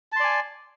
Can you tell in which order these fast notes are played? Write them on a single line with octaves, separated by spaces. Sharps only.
A5 C6 D5 G#5